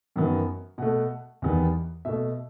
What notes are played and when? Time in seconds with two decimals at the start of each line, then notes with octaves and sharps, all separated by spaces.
0.16 F#2 D#3 F#3 B3
0.78 B2 A3 F#5
1.42 E2 D#3 G3 B3
2.05 B2 A3 E5